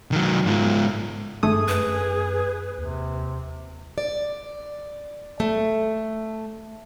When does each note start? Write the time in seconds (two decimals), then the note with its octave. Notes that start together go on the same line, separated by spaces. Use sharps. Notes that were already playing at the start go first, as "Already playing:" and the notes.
0.12 D#3 F#3
0.46 G#2 F4
1.43 G#1 G2 A3 G#4 D#6
1.68 F#2 B4
2.78 D#2 C3
3.98 D5
5.40 A3